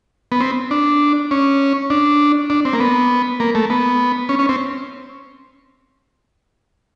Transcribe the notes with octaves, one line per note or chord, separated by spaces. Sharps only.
B3
C4
D4
C#4
D4
D4
C4
A#3
B3
A#3
A3
B3
C#4
C#4
C4